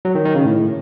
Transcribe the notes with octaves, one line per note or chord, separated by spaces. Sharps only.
F#3
D#3
D#3
C#3
A2